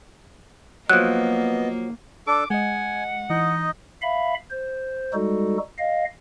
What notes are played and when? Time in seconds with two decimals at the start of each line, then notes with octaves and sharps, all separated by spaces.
0.90 F3 F#3 A#3 B3 D#5 F#6
2.27 D4 A4 D6
2.50 G#3 D#5 F#5 G#5
3.30 E3 D#4 D#5
4.02 E5 F5 B5
4.50 C5
5.14 G3 G#3 D#4 F#4 A4
5.78 D#5 F5